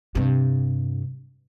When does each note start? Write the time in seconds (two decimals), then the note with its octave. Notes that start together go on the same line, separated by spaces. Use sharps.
0.15 G2 C3